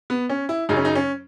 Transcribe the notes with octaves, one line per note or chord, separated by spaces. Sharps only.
B3
C#4
E4
F#2 C#3 F#3 D#4
C#4
D#4
C#4